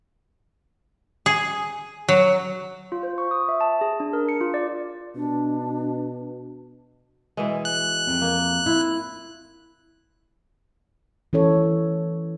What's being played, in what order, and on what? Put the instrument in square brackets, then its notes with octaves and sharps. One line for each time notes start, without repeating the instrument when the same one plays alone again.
[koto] G#4
F#3
[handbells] F4
C5
C#6
D#6
E5
A5
G#4
D4
A#4
C#7
F4
D5
[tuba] B2 [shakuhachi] D4
[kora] B2 E3 G#3
[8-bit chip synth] F#6
[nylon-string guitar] F2
[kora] A#3
[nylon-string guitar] E4 F4
[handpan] E3 C#4 A4 C#5